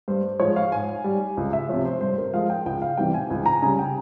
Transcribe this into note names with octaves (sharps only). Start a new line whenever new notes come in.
G2 C5
F3 G#3 C#5
F5
G#2 G#5
G3
C#2
E5
C3 F3 C#5
C5
G2 C5
A#4
F3 G#3 F5
G5
C#2 G5
F5
C3 E3 G3 G5
G#5
C#2 G#5
A#5
C#3 G3 G#5
G5